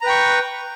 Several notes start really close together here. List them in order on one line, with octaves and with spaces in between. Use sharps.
A#5 B4 G5 C#6